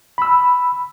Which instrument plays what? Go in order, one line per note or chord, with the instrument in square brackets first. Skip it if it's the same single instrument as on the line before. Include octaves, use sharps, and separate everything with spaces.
[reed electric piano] B5 E6